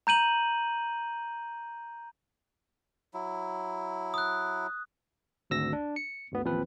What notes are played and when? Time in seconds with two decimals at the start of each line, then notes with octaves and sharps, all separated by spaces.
0.07 A#5 G6 D#7 F#7
3.14 F#3 E4
4.14 D#6 F#6
5.50 G#1 D2 E6 A#6
5.73 D4
5.96 C#7
6.32 G1 D2 B3
6.44 A1 D#2 F3 C4 B4